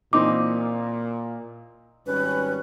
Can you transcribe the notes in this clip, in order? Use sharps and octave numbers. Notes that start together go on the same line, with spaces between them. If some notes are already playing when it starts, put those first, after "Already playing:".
A#2 E3 C4 D#4 D6
G#1 G3 C#4 B4